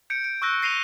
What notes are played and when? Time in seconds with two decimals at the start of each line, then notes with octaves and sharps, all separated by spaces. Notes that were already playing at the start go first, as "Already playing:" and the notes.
0.10 G6 C#7 D7
0.24 D7
0.42 C#6 E6 F#6 A#6 D7
0.62 A#6 C7 D#7 F7 G7